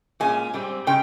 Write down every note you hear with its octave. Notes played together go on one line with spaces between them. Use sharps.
A#2 G#3 C#4 G#5
G#2 G3 C4
C#3 G#3 C#4 G5